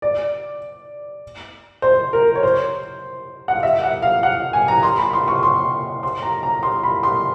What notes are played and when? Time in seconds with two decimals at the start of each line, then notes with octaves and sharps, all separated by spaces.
0.02 D5
1.82 C5
2.13 A#4
2.35 C#5
2.43 C5
3.48 F#5
3.56 F5
3.63 E5
3.83 F#5
4.02 F5
4.23 F#5
4.53 G#5
4.68 A#5
4.83 C6
4.98 B5
5.13 C6
5.28 C#6
5.43 C6
6.03 C6
6.22 A#5
6.43 A#5
6.63 C6
6.83 B5
7.03 C6